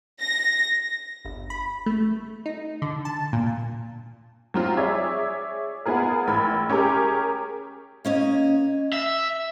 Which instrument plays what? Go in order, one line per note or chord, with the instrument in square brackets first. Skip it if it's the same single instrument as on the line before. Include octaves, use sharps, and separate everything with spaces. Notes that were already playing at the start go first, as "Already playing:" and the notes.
[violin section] A#6
[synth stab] G1
B5
A3
D#4
D3
A5
A#2
[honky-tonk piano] F#3 C4 F4
G#4 C#5 D5 E5
B3 F4 G#4 A#4
A1 B5 F6 G#6
C#4 G4 G#4 A#4
[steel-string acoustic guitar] A#3 C#4 D#5
[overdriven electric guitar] E5